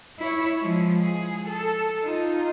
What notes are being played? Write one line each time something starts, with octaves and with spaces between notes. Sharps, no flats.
E4 C#5
F3 G#3
G#4
A4
D#4 F4